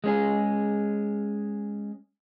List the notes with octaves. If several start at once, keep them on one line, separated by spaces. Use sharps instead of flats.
G#3 C#4 G#4